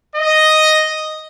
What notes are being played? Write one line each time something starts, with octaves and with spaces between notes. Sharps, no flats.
D#5